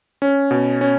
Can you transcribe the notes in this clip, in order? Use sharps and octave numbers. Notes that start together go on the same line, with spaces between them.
C#4
B2
C#4